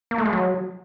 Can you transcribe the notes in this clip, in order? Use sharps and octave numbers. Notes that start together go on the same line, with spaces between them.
A#3
A3
G#3
F#3